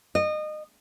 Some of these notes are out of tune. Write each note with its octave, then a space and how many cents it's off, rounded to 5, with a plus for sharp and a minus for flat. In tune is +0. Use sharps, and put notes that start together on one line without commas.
D#5 -25